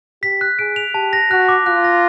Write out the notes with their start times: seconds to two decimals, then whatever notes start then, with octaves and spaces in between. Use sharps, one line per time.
0.23 G4 B6
0.41 F#6
0.59 G#4 D7
0.76 F7
0.94 G4 A5
1.13 A#6
1.31 F#4 F#6
1.48 D6
1.66 F4 F#6
1.84 A#6